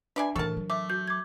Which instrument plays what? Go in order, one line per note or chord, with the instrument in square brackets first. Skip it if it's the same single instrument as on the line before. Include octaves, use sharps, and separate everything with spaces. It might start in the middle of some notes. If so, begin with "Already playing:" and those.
[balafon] D4 E5 [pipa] B4 D5 G#5
[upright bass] A2 D#3 [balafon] E3 A#4 [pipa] A4 A5
[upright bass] F#3
[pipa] A3 [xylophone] D6
[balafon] F#4 [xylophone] G6
[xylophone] D6 G#6